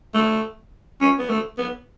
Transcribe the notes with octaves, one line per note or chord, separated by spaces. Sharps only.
A3
C#4
B3
A3
B3